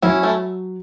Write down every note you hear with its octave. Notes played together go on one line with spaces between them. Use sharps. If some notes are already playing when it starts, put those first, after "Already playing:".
F#3 C#4 E4
A3